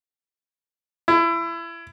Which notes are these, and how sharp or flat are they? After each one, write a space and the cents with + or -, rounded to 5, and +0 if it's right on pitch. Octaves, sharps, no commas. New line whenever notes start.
E4 +25